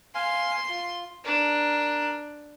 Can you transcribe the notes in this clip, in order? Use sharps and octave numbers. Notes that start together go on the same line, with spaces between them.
F5 G#5 C6
F4
D4 A#4